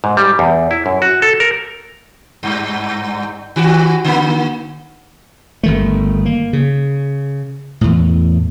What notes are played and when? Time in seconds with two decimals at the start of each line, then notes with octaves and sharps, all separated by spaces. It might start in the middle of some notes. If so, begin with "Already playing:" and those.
0.04 G#2
0.17 G3
0.39 E2
0.71 E4
0.86 F#2
1.02 F#4
1.22 A4
1.40 A#4
2.43 G2
3.56 D#3 F#4
4.05 D3 A#3
5.63 G1 D#3 A3
6.25 A#3
6.53 C#3
7.81 E2 A2